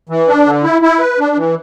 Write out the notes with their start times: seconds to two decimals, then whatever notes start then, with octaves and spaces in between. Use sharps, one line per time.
0.09 E3
0.28 D4
0.46 D3
0.63 E4
0.82 E4
1.00 B4
1.19 D4
1.36 E3